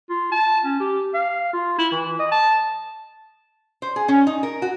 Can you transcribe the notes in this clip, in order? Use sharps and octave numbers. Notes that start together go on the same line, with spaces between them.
F4
A5
C#4
G4
F5
F4
E4
E3
D#5
A5
C5
G#4
C#4
D#4
A#4
F#4